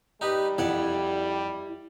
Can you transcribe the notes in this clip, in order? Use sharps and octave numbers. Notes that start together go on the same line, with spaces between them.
G3 D#4 G4 B4
F2 E4 G4 F#5